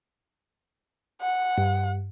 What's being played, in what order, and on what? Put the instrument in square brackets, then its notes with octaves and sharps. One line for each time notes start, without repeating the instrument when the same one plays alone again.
[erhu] F#5
[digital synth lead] G2